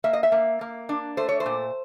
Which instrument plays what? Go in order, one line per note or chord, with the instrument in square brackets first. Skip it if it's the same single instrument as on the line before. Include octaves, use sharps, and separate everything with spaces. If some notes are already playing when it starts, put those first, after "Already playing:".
[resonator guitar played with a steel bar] A#3 E5
D#5
E5
A#3
A#3
D4
A3 C5
C#5
C5
A#2